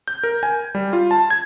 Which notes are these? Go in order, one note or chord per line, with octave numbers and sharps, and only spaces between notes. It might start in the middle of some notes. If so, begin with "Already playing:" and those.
G6
A#4
G#5
G3
F4
A5
G#6